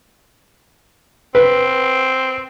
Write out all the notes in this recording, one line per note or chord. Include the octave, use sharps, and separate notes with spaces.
C4 B4